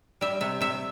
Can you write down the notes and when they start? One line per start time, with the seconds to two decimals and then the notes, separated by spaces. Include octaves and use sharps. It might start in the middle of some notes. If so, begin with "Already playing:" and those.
0.21 G3 E5
0.41 C3 E5
0.61 C3 E5